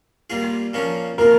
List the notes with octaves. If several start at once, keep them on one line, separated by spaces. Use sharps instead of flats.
G3 A#3 F4 G#4
A#2 F3 A#3 C#4
F3 A#3 F4 A#4